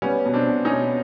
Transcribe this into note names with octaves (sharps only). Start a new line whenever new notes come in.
G3 B3 C#4
B2
C4 D4
B2
C#4 D#4
B2